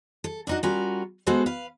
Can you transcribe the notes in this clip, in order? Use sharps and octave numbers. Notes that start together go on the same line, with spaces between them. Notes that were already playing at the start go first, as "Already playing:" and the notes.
A4
D4 D#4 F#4
G3 C#4 F4 F#4 A#4
G#3 B3 F#4 A4 C5
B4 F5